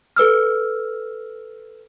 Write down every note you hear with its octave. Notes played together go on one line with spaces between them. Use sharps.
A4 B4 E6 F6